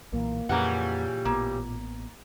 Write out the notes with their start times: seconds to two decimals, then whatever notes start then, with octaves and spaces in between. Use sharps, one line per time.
0.12 B1 A#2 E3 A#3
0.49 F2 A#2 C#3 E3 G3 A#3 F#5
1.25 A1 A#3 B3